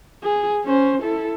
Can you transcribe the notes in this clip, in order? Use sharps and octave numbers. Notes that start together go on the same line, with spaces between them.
G#4
C#4 C5
E4 A4